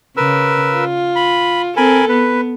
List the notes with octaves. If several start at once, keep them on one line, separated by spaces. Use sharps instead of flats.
C#3 A#4 B4 E6
F4
B5
C4 A4 A#4 G#5 B5
B3 B4